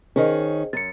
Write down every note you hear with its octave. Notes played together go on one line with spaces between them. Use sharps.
D#3 C#4 G#4 C5 D#5
F#2 A6 C#7